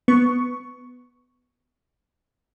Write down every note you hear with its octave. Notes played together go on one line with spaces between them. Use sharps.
B3 C#6